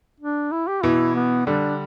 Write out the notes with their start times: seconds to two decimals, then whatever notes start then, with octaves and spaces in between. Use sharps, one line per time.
0.20 D4
0.52 E4
0.68 G4
0.83 B2 E3 E4
1.16 B3
1.46 D3 G3 D4